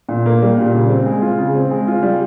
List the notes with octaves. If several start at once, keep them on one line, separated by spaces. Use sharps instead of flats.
A#2
A#3
G3
A#2
C#3
C4
G#3
F4
C#3
C4
G#3
F4
G3